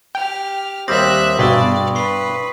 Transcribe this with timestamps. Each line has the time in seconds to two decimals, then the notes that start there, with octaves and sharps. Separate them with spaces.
0.15 G4 G5 F6
0.88 D#2 G3 C4 E5 C6 D#6 F#6 A#6
1.39 G2 B2 G#4 D5 B5 C#6 E6
1.95 B4 C#6 C7